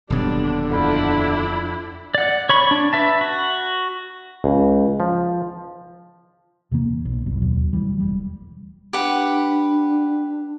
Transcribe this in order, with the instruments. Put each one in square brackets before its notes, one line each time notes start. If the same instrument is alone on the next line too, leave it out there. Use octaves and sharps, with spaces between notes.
[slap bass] D#1 B2 F#3 [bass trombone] D3 [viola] G3 D4
[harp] F2 B5 G6 [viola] D4 E4
[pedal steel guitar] D5 F#5
C#5 B5 C#6
D4
B4 E5 A5
F#4
[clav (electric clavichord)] C#2
F3
[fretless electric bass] E2 C3 E3 A#3
B1
G1 C2 F#2
D#2 B2 F#3
D1 D2 E3 G3
E1 G3
[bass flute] D4 [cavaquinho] G4 B4 F#5